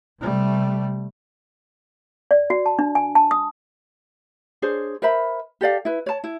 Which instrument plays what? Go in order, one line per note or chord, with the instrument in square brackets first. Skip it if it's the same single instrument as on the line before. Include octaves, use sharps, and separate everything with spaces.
[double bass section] C3 G3 A3
[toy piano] D5
F#4
A5
D4
G#5
A5
D#6
[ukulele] D4 G#4 C5 C#5
A#4 C5 E5 B5
G4 A4 D5 F5
E4 B4
C#5 A5
E4